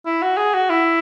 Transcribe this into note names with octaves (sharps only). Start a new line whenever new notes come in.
E4
F#4
G#4
F#4
E4